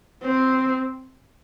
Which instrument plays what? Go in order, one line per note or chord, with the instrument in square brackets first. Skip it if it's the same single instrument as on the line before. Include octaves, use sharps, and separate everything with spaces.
[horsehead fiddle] C4